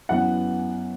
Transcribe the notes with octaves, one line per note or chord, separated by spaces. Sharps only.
F#2 E3 B3 F#5